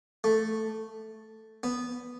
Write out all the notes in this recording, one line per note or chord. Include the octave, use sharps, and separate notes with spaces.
A3
B3